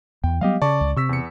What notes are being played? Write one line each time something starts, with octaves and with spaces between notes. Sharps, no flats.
E2 G5
F#3 G3 B3 G4 D#5 F5
C#3 D5 A5 C#6
C#2
C3 C#6 E6 B6
E2 C#7